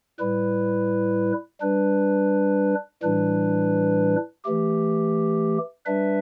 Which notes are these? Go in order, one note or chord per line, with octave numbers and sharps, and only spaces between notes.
A2 G3 E4 B4
G3 D4 B4
A2 E3 G3 D4 B4
E3 A3 G4
G3 D4 B4 E5